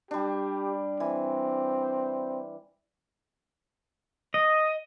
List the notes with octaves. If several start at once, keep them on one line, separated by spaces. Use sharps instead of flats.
G3 D4 G4
E3 C4
D#5